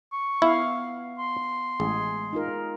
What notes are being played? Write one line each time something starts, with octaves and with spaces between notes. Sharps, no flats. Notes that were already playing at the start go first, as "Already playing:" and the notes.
C#6
B3 E4 F5
C6
A1 G#3 G#4
D#4 F4 A#4